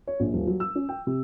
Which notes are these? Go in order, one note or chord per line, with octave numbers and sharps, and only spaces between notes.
C#5
A#1
D#1
F#3
E6
C#4
G5
C3